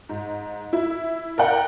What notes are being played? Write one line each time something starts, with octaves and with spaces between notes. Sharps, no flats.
G#2
E4 E5
A#4 D5 F#5 G5